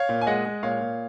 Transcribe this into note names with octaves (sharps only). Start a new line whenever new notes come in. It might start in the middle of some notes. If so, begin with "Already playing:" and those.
Already playing: C#5 F5
A#2
G#5
G#3 D#5 F#5
G#3
A#2 C#5 F5
A#2